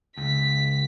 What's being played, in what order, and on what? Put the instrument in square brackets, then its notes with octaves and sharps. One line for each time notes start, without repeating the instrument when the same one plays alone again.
[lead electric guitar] C#2 [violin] B6